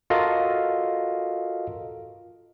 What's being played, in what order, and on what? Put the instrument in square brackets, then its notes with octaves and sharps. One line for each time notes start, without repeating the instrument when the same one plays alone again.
[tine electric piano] F4 F#4 A4 A#4 D#5 F5